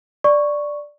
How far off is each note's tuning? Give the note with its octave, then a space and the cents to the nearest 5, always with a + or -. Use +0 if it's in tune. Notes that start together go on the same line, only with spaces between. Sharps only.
D5 +0 C#6 +0